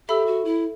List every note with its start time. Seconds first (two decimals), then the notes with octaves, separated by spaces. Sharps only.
0.08 G4 A4 E5 B5 E6
0.26 F#4
0.45 E4